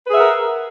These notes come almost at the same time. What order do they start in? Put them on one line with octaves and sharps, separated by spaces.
B4 G#4 E5 F#5 A#4